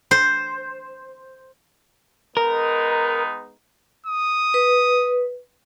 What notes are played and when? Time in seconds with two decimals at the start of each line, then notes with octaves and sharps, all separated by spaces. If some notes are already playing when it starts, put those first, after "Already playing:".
0.11 C5
2.37 G#3 B3 D#4 A#4
4.07 D#6
4.54 B4